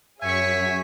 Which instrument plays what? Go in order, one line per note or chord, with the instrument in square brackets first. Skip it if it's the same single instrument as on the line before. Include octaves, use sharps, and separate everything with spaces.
[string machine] F#2 B6 [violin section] G#4 C#5 C#6 [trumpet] E5 [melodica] G#5